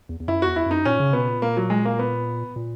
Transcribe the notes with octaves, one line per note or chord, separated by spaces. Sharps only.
E2
E2
F#2 E4
F#4
E2
E4
F#2 D#4
A#2 C#4
C#3
B2 B3
A#2
A#3
F#3
G#3
A#3
B3
A#2